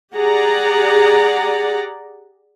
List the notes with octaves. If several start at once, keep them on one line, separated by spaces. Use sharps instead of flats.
G4 G#4 D5 F#5 A#5